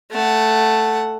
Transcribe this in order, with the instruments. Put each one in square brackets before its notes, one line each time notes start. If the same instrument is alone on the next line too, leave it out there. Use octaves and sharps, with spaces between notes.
[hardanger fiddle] A3 F#5